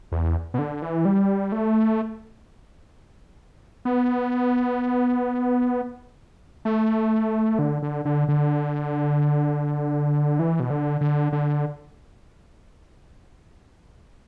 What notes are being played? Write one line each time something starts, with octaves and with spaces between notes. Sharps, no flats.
E2
B2
D3
E3
G3
A3
B3
A3
D3
D3
D3
D3
E3
B2
D3
D3
D3